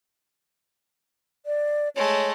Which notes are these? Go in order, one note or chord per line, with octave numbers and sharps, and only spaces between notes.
D5
G#3 A3 C#5